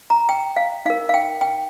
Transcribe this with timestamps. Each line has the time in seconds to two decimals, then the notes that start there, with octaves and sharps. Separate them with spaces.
0.10 A#5
0.29 G5
0.56 F5
0.86 D#4 A#4 F5
1.09 F5
1.14 G5
1.41 G5